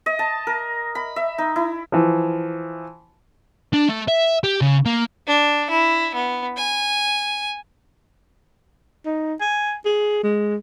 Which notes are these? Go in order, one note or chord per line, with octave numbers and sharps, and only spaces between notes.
D#5
A5
A#4
B5
E5
D#4
E4
E3 F3
D4
A3
E5
G4
C#3
A#3
D4
E4
B3
G#5
D#4
G#5
G#4
G#3